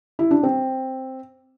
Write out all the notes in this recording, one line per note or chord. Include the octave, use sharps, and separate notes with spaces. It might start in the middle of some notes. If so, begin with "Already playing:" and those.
E4
D4
C4